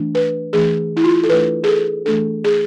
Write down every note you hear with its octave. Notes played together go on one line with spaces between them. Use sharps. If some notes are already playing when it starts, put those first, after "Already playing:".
Already playing: E3 A3 D4
B4
E3 A3 D4 G#4
E4
F4
A4
E3 A3 D4 B4
G#4
A4
E3 A3 D4 A4
G#4